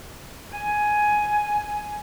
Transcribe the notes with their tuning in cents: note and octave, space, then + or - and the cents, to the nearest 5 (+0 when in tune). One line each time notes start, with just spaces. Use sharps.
G#5 +10